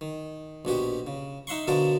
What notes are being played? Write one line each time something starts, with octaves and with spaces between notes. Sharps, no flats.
D#3
A#1 B2 F#4 G4
C#3
D#4 E5 F#5 C6 C#6
B2 D3 F3 F#4 A#4 A5